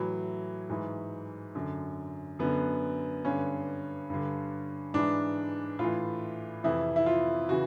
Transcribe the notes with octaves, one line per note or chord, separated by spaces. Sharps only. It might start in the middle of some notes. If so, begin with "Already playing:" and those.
Already playing: A2 E3 F#3
G#2 E3
F#2 D3
F#2 D3 B3
G2 D3 C#4
G2 D3
G#2 E3 D4
A2 E3 F4
F2 C3 E3 E4
E4
F4
C#3 E3 F#4